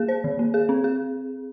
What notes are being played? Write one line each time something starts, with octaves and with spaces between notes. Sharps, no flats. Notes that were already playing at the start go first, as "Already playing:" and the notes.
Already playing: A#3 G#4
C5
D#3
A#3
G#4
C4
G#4